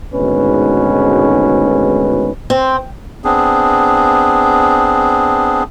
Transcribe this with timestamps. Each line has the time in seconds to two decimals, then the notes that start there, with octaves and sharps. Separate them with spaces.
0.13 G#1 D2 G#2 B2 C#4 B4
2.50 C4
3.24 B3 C4 D4 G#4